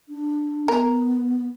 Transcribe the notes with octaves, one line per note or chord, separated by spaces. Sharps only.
D4
B3 A#4